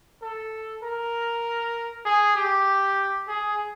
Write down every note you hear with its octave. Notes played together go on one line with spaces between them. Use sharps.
A4
A#4
G#4
G4
G#4